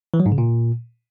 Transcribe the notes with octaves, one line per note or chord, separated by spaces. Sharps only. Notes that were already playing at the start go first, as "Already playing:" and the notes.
E3
F#3
G#2
C#3
A#2